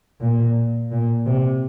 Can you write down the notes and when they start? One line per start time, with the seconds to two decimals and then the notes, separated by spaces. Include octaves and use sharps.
0.21 A#2
0.92 A#2
1.26 C3